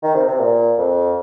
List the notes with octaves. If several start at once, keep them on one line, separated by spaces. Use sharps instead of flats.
D#3
C3
C3
A#2
F2